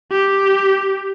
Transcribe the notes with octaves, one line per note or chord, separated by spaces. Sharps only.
G4